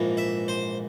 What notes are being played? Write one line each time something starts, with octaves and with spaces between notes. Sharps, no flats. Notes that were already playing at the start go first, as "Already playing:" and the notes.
Already playing: A#1 G#2 E3 A#3
E5
C5